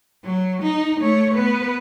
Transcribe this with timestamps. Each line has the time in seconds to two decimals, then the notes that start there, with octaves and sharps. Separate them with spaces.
0.24 F#3
0.62 D#4
1.00 A3 C#5
1.34 B3 B4